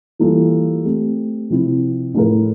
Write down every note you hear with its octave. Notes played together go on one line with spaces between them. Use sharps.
E3 G3 A#3 F4 A4
A3 C4 G4
C3 F3 C4 E4
A2 F3 A3 E4 A#4